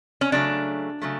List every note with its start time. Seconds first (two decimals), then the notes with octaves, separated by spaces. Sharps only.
0.21 C#4
0.32 C#3 F#3 A3 D4
1.02 C#3 F#3 A3